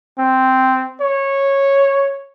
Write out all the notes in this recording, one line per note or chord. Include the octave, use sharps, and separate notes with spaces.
C4
C#5